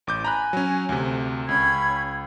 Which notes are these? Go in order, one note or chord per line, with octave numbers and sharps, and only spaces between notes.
A1 D6 G6
G#5 A#5 B5 F#6
F#3 C#4
D2 C3
C#2 C#4 B5 G#6